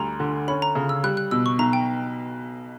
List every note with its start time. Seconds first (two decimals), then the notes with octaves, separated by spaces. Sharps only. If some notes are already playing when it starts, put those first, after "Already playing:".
Already playing: D2 G3 A#5
0.20 D3
0.48 C#4 B5
0.62 A#5
0.75 C#3
0.89 E6
1.04 G3 F#6
1.17 F#6
1.31 B2 E6
1.46 C#6
1.59 B1 A#5
1.73 G5